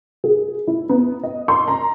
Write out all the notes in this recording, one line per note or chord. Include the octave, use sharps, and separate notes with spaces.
G#4
E4
B3
D#5
C6
A#5